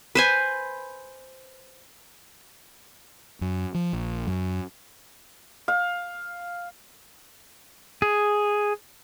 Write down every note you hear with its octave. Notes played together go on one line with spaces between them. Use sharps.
B4 C5 G#5
F#2
F3
A#1
F#2
F5
G#4